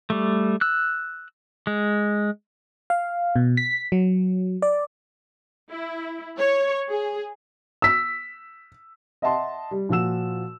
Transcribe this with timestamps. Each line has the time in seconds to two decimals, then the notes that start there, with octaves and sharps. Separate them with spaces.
0.10 G3 A3
0.61 E6 F#6
1.67 G#3
2.90 F5
3.36 B2
3.57 B6
3.92 F#3
4.62 D5
5.71 E4
6.39 C#5
6.89 G#4
7.82 E6 B6
9.22 D#5 E5 F#5 A5 C6
9.71 G3
9.89 A#2 F3 F#4 E6 E7